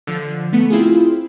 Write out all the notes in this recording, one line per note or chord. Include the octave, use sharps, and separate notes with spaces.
D3 F3
A3 B3
C4 E4 F4 G#4